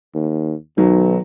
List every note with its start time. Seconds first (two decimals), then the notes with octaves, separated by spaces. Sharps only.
0.15 D#2
0.78 B1 D#3 F#3